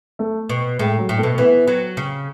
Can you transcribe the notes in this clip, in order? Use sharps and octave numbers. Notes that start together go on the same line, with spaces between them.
A3
B2
A2 G#3
F#3
A2
A3
B2
E3 B3
F#3
C#3